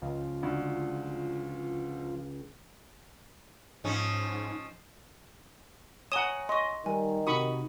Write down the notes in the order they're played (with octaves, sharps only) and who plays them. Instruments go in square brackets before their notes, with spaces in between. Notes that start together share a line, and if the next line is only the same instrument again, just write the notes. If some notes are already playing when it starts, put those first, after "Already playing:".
[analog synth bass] C#2 [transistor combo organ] F3 F4
[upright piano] D2
[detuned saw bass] G#2 [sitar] F3 C#4 D#4
[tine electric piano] C#5 G#5 A#5 [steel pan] F#5 D#6 [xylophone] E7 G7
[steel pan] D#5 [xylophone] C6 C#6
[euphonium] D#3 [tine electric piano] G3 A#4 [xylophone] G#5
[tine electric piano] C3 D#4 F#4 [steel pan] B5 C#6 D#6